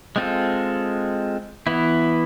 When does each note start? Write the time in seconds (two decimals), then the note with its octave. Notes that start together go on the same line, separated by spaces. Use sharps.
0.16 G#3 C4 F4 A4
1.67 E3 B3 E4